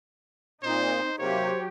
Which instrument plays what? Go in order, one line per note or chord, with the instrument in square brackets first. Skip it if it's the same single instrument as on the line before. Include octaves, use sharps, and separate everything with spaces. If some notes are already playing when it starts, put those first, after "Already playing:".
[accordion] A#2 [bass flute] C4 [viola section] D#4 [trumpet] C5
[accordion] C3 A#3 [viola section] F#3 G4 [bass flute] C5 [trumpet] C#5